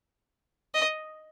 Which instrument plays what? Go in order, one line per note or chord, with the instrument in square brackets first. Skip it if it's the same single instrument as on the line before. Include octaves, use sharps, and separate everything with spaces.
[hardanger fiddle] D#5